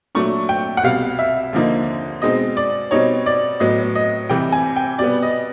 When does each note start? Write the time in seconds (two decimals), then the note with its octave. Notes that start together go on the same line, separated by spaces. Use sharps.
0.15 A#2 F#3 A3 D4 C#6
0.49 G5
0.77 F#5
0.84 C2 B2 G3 F5
1.19 E5
1.53 D#2 D3 F3 A#3 D#4
2.22 B2 G#3 C4 D#4 D#5
2.57 D5
2.91 B2 G3 C4 D#4 C#5
3.26 D5
3.60 A2 F#3 B3 D#5
3.95 D#5
4.30 C3 E3 G3 G5
4.52 G#5
4.76 G5
4.99 B2 G3 B3 D5
5.22 D#5